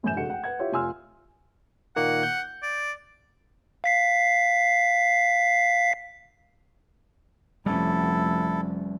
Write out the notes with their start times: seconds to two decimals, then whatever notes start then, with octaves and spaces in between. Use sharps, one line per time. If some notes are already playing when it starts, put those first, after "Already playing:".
0.03 F#2 A2 E3 G#5 G6 E7
0.17 F1 D3 G#3 F#4 F#5 C#7
0.30 F#5 G5
0.44 B4 F#5 G#6
0.59 E4 F4 G4 C#5 E5
0.72 F1 F4 G#5 C6 E6 F6
1.96 A#2 D#3 A#3 F#5
2.23 G6
2.63 D5
3.84 F5 B6 C7
7.66 F1 G3 C#4 E4 A4